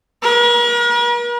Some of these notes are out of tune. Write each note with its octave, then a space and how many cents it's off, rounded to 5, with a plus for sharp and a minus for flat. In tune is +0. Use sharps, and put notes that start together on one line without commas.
A#4 +45